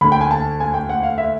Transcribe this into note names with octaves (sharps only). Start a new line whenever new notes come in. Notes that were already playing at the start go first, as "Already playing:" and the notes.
D2 D3 B5
G5
G#5
A5
G#5
G5
F#5
F5
E5